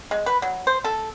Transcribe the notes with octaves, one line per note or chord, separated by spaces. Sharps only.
G#3
B4
F#3
C5
A4